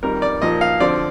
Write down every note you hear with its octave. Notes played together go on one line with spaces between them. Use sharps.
F2 D#3 G3 A#4
D5
A#2 F3 A#3 D#4 D#5
F5
D3 F3 C4 D5